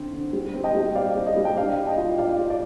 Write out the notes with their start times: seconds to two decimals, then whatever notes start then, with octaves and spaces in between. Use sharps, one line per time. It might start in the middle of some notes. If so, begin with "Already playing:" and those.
Already playing: D3 C4
0.13 D3
0.33 G3
0.54 C4
0.64 D#5 G5
0.75 G3
0.95 C4 D5 F5
1.15 G3
1.26 D#5
1.36 G3
1.45 G5
1.56 D4 D5 F5
1.78 D4
1.87 D#5 G5
1.98 F4
2.18 F4 D5 F5
2.39 F4
2.50 D5